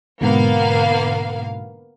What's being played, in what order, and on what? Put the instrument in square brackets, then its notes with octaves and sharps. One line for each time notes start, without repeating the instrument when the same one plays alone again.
[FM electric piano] G#2 B2 D3 [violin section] A#3 B3 F5